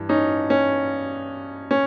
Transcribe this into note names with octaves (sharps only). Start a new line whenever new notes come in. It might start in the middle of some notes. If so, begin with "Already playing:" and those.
Already playing: G2 E3
C#4 D#4
C#4
C#4